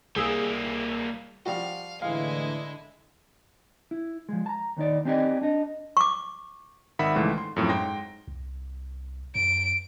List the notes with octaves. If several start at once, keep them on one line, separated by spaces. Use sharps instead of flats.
C2 G3 A#3 G#4 E6
F3 G3 F#4 F5
A2 D3 E3 G#3 E4 F5
E4
F3 G#3
A5 A#5
D#2 D#3 D#4 D5
C4 C#4 D#4 G4 D5 D#5
D4 D#5
C#6 D6
G#1 D#3 E5 F#5 B5
C#2 G#2 E3 A3
C6
F#2 A2 F3 C4
G#2 G5 C6 A#6
C2
F#2 D7